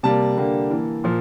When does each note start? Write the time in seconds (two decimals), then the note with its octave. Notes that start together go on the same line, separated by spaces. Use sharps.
0.03 C3 G3 A#3 A5
0.37 D3 G3 A#3
0.71 E3 A#3
1.04 A#2 F3